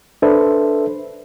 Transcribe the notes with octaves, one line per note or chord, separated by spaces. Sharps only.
D4 A4 B4 C5 E5